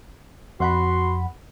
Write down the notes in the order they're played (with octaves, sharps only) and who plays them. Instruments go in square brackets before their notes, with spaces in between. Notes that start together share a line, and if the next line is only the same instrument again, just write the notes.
[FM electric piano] F2 F#5 B5 [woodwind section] F#4 C6